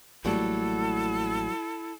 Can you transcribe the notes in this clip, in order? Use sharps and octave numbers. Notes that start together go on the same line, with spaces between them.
A1 F#3 G3 A3 A#3 E4 A4